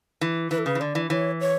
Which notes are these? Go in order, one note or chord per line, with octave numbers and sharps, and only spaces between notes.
E3
E3 B4
A4
C#3 B4
E3
D3 D5
E3
E3 C#5
C#5